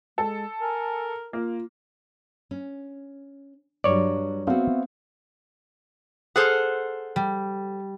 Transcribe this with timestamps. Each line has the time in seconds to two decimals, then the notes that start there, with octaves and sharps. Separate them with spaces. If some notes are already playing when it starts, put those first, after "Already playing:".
0.18 G#3 A4
0.61 A#4 G#5
1.33 A#3 F4
2.51 C#4
3.84 G2 F#3 G3 C#5 D5
4.47 A3 B3 C4 F#4 F5
6.36 G#4 A4 C5 F#5 F6
7.16 G3